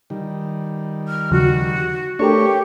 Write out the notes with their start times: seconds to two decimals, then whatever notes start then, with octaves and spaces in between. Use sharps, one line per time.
0.10 D#3 G3
1.07 F6
1.31 D#2 C#3 F3 F#4
2.19 A3 D4 G4 A4 A#4 C#5 C#6